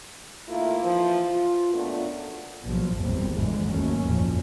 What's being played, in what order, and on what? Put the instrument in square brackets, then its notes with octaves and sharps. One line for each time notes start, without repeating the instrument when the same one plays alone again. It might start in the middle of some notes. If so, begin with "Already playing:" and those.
[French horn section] D#3 A3 A#3 E4 F4
E3 F3
F4
F#2 A#2 A3 B3 D4
[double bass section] A#1 B2 F3 F#3
G#1 E2 A#2 G3 C4
G#1 F2 D3 E3 G#3
D#2 F#3 A3 C#4
F#1 F2 A#2 F3